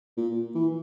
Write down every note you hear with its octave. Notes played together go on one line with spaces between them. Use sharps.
A#2
E3